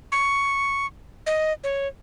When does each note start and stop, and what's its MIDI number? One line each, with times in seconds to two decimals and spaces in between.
0.12 0.87 85
1.26 1.53 75
1.64 1.87 73